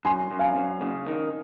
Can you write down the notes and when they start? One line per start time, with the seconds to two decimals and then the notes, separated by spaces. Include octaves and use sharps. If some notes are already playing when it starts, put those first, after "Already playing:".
0.05 F#2 G#5 C6
0.31 F#2
0.39 F5 G#5
0.56 F#2
0.81 C#3
1.06 D#3